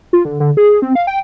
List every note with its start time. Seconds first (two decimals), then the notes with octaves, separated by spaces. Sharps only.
0.13 F4
0.25 D3
0.40 D3
0.57 G#4
0.82 C4
0.95 F5
1.07 G5